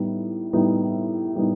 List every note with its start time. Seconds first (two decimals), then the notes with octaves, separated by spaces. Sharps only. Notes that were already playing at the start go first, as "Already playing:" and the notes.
Already playing: A2 G3 B3 D#4
0.53 A2 G3 B3 D#4
1.35 A2 G3 B3 D#4